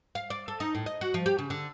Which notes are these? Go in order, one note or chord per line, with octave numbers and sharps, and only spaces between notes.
F5
D5
A4
D#4
A2
D#5
F#4
F3
G4
C#3
D3